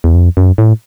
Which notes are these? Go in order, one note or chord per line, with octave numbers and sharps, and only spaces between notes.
E2
F2
F#2
A2